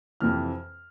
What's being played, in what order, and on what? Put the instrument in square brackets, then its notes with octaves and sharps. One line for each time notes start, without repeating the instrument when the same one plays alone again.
[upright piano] F2 C3 E3 F6